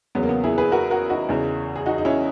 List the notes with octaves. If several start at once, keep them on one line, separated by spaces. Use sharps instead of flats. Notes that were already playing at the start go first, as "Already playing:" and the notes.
E2 C#3 F#3 B3
A#3
B3
E4 G#4
G#4 B4
F#4 A#4
F#4 A#4
D#4 F#4
E2 C#3 E3
G#4
D#4 F#4
D#4
C#4 E4